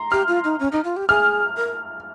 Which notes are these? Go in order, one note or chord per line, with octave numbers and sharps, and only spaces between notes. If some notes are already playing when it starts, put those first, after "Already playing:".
Already playing: A#5 C6
G4 F6
F4
D#4
C#4
D#4
F4
G4
G#4 F6
A#4